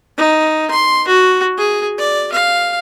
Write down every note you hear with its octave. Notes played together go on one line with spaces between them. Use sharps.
D#4
C6
F#4
G#4
D5
F5